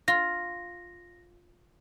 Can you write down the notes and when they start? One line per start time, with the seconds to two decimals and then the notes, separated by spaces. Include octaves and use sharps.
0.08 F4 A#6